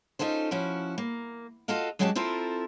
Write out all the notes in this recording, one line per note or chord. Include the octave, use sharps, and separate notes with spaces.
C#4 D#4 F4 A4 C5
F3 C#4 E4 F#4
A#3
F4 F#4 A4 D#5 F5
F#3 G#3 C#4 F#4 G4 A5
C4 E4 F4 A4 A#4